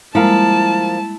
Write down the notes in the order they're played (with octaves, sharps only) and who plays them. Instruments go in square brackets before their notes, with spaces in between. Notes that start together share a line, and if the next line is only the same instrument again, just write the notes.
[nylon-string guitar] F3 A#4 F5 [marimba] G3 G#3 A#3 [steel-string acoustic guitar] E4 [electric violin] A5